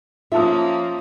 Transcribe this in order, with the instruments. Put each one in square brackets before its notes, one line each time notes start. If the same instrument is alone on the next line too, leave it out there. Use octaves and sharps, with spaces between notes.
[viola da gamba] F3 A#3 C#4 [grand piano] F4 A5 D#6 [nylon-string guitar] E5